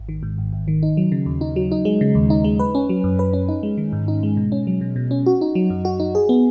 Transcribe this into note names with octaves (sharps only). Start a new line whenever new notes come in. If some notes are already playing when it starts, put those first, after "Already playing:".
Already playing: G#1
D#3
G#2
G#1
G#1
D#3
D#4
F#3
C#3
D#2
D#4
F#3
D#4
G#3
C#3
D#2
D#4
G#3
B4
C#4
F#3
F#2
B4
C#4
D#4
G#3
D#3
G#2
D#4
G#3
B2
C#4
F#3
B2
B2
C#4
F#4
D#4
F#3
F#2
F#4
D#4
G#4
B3